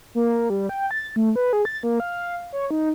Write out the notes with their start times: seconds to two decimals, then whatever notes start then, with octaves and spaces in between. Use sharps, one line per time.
0.15 A#3
0.50 G3
0.69 G5
0.91 A6
1.16 A3
1.36 B4
1.53 G#4
1.65 A6
1.83 A#3
2.00 F5
2.53 C#5
2.71 D#4